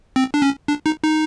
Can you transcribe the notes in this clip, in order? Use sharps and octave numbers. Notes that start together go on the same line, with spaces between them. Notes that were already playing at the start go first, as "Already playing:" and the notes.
C4
D4
C#4
D4
D#4
D#4